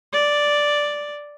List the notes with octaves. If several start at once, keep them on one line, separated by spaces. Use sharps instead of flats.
D5